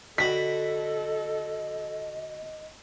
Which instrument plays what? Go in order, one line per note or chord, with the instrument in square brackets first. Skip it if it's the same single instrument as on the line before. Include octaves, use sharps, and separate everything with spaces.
[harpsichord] D3 F#4 B5 [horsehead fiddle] A4 [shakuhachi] D#5 [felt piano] B6